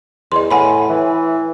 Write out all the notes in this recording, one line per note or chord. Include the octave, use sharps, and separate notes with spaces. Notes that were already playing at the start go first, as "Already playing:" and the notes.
E2 D#5 C6
A2 F#5 G#5 B5
E3